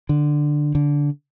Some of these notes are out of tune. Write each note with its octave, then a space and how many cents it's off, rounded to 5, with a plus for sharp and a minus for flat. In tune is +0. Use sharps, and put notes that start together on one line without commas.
D3 +10
D3 -15